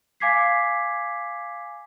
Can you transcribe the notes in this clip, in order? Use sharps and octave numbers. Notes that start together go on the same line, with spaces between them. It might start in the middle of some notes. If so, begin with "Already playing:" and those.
F5 G#5 D6 G#6 B6 C7